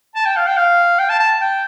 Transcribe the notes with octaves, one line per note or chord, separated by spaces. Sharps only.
A5
G5
F5
G5
F5
G5
A5
A5
G5